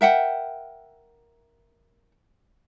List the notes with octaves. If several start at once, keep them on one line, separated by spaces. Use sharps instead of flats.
A#4 E5 F#5 G5